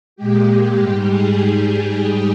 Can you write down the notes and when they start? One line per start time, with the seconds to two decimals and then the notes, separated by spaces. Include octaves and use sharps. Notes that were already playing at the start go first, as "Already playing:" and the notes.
0.16 A#2 G#3 G4
0.75 G#2 G3 G4
1.06 G#4